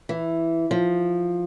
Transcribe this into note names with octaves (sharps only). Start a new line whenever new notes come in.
E3
F3